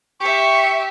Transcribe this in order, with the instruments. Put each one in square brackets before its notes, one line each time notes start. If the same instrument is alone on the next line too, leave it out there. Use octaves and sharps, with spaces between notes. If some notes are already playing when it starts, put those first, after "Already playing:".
[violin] G4 E5 [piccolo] C#6